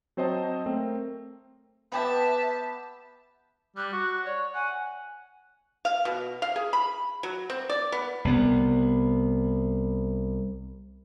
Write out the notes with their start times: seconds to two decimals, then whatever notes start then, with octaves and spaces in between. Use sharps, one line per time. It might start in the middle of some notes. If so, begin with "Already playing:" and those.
0.17 F#3 C4 C5 C#5 D#5 A5
0.66 A3 C4 A#4
1.92 B3 G4 E5 A5
3.76 G3 F#6
3.93 F#4
4.25 C#5 D5
4.54 F#5 G#5
5.85 F5
6.05 B2
6.42 F5
6.56 G#4
6.73 B5
7.23 F#3
7.50 C4
7.70 D5
7.92 B3
8.25 C2 B3